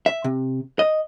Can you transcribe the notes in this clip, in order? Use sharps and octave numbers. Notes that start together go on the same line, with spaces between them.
E5
C3
D#5